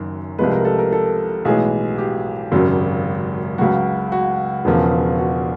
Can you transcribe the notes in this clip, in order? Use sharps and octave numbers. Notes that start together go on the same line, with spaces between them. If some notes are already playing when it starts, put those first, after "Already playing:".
Already playing: F#1 F#2 D#3 F#3
C2 C3 F3 G#3 B4
A#4
A4
A#4
A4
B1 A2 E3 G#3 G#4
G4
G#1 F#2 C#3 F#3
C#2 C#3 F#3 F#4
F#4
E1 E2 C#3 F3
F#4